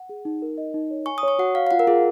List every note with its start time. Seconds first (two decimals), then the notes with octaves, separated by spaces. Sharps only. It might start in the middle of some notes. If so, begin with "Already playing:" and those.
Already playing: F#5
0.09 G#4
0.25 D#4
0.42 A#4
0.58 D#5
0.74 D#4
0.91 C#5
1.06 G#5 C#6
1.18 D#6
1.23 C#5 C#6
1.39 F#4 F#5
1.55 F5 F#5
1.67 F5
1.71 F4 F#5
1.79 A#4
1.87 F4 G#4